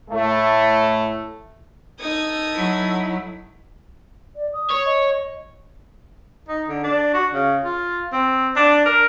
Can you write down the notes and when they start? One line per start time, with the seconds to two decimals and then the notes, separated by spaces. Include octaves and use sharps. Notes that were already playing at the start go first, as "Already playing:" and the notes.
0.10 A2 A3
2.00 D#4 A4 D#6 G#6
2.53 F#3 E4
4.36 D5
4.53 D#6
4.70 C#5
4.85 D#5
6.49 D#4
6.69 D3
6.84 D4
7.14 F#4
7.33 C#3
7.64 F4
8.13 C4
8.56 D4
8.86 A#4